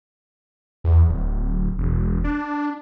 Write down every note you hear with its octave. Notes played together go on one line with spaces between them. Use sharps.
E2
D1
E1
D4